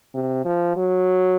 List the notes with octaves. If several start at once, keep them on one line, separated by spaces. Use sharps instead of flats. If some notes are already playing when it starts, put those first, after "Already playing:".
C3
F3
F#3